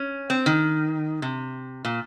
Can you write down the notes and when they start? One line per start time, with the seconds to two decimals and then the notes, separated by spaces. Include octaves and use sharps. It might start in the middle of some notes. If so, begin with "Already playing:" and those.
Already playing: C#4
0.30 C4
0.46 D#3
1.22 C3
1.85 A#2